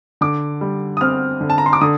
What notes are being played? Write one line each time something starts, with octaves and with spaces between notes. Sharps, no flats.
D3 D6
G3
D#6
C4 F6
D3
A5
A#5
C6
D6
D3 D#6